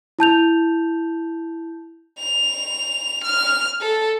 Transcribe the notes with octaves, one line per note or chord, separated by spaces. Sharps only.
E4 A5 G6 F7
F7
F6
A4